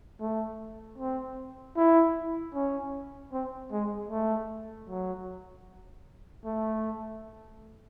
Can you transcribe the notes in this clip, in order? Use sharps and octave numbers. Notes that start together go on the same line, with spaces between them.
A3
C4
E4
C#4
C4
G#3
A3
F#3
A3